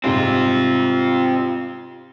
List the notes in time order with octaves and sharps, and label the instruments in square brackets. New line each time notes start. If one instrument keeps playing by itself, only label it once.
[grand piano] G#2 C3 G3 [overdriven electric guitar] C4 F4